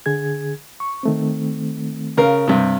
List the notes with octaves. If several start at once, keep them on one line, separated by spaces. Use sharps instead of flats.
D3 G#4 G#6
C#6
D#3 A3 C4
C#3 A#4 F5
G2 C3